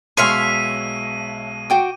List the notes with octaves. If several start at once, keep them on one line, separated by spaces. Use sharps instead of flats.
B1 B2 G#3 C#5 E5 F5 C6 D#7
F#4 G5 D6